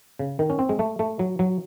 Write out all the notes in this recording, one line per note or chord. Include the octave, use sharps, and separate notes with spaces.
C#3
D#3
C#4
C4
G#3
A3
A3
F#3
F#3